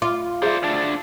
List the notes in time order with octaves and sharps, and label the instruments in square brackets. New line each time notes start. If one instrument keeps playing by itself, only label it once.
[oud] F4 [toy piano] D6
[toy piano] G#4 E5 [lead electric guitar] C5 D5
[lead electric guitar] D2 D4